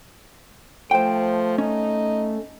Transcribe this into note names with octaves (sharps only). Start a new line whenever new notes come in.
F3 A3 C5 G5
C#4 D#4